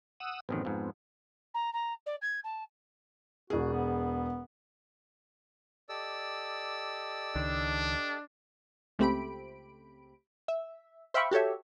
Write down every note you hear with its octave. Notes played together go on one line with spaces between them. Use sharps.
F#5 D#6 E6
A1 F#2 D#3 B3 C4
F2 G#2
A#5
A#5
D5
G#6
A5
E1 F#4 G#4
B3
G4 A4 D5 D#5 E6
C#2 D#3 D4
C#2 A3 C4 G4 B5 D7
E5
C5 E5 F5 G5 B5 C#6
F#4 G4 A4 C#5 E5